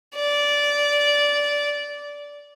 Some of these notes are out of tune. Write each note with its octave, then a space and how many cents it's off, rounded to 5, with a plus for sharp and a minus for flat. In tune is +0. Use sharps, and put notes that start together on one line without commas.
D5 -15